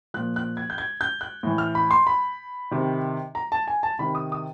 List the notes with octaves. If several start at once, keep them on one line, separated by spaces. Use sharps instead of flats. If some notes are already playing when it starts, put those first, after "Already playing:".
A#2 F3 F#6
F#6
G#6
G6
G#6
G6
F#6
A2 E3
F6
B5
C6
B5
C3 D#3
A#5
A5
G#5
A5
C3 D#3 B5
D#6
D#6